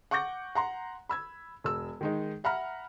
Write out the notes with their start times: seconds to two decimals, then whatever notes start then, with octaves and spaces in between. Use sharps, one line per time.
0.11 F#5 C#6 D6 G6 A#6
0.55 F#5 A#5 C6
1.09 B5 E6 G#6
1.64 E1 E6
2.01 D#3 G#3 D#4
2.44 E5 F#5 A#5 B5 F6